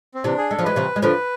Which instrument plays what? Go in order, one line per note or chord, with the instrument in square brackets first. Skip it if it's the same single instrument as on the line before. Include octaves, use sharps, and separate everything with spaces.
[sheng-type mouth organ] C4
[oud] C3 E3 [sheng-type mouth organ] D4
[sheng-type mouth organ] G#4
[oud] G#3 [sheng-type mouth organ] A4
[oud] F3
[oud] E3 G#3 [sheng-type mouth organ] B4
[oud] C3 E3
G#3
[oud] D3 F3 [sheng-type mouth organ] B4